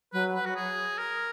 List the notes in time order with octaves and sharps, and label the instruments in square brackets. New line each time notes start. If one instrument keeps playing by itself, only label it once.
[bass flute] F#3 [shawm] B4
[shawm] B4
F#4
G#4
A#4